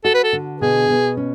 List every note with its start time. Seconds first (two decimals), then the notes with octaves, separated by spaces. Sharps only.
0.04 F#4 A4
0.14 B4
0.24 A4
0.33 D3
0.61 B2 G#4
0.89 B2
1.17 C#4